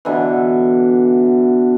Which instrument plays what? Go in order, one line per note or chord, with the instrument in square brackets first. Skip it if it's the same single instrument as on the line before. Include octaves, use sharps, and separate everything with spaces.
[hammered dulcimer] B2 D3 E3